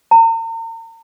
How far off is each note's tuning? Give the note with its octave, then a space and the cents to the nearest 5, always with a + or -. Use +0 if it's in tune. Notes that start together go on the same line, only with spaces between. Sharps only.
A#5 -40